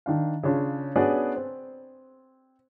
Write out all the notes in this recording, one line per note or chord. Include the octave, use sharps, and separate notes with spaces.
D#3 D4 F5
C#3 C#4 D4 F4
B3 C#4 D4 F#4 G#4 D5
C4